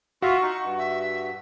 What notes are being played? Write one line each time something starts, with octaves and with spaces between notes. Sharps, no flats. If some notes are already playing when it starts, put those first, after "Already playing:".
F4 F#4 E5 F5 C#6
D#4
G2
E5